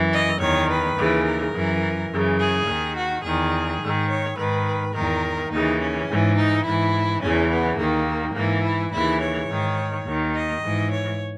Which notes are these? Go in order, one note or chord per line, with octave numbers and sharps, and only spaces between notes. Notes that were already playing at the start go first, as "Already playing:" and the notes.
Already playing: F#2 E3
D#5
E2 D#3 C#5
B4
D#2 C#3 E3
A#4
F#2 E3
F#2 C#3 E3
G#4
D#2 D#3
F#4
E2 D#3 G#4
G#2 D#3
C#5
G#2 D#3 B4
E2 D#3 A#4
D#2 C#3 E3 D#4
C#4
G#2 E3
D#4
G#2 E3 E4
E2 C#3 E3 C#4
B3
D#2 D#3 A#3
G#2 E3 A#3
E4
D#2 C#3 E3 E4
C#5
G#2 D#3
D#2 D#3
D#5
G#2 E3
C#5